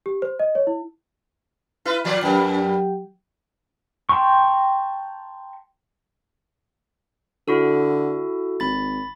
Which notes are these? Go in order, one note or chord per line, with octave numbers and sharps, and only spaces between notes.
G4
C5
D#5
C#5
E4
E4 B4
A#2 F3 D5
F#2 F#3 G4 A#4 G5
G5 A5 A#5 C6 C#6
D3 E4 F#4 A4
G#1 B5 A6